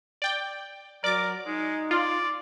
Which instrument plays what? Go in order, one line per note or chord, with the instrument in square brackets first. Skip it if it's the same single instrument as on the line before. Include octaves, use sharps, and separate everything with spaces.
[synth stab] D5 G5
[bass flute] F#3 [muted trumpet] A#4 [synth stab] D5 D6
[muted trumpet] G#3 [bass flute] D#4
[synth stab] F4 [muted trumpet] D5